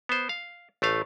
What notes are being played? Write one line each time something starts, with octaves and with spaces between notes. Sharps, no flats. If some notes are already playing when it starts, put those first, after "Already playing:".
B3 C5
F5
A1 A3 F5